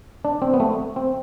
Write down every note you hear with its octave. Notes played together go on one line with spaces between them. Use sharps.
D4
C4
B3
A3
C4